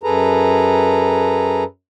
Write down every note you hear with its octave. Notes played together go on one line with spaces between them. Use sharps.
F#2 G#4 A4 B4 A#5